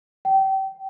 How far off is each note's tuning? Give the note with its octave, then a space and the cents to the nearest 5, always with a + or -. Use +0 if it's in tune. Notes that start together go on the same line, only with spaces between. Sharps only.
G5 -25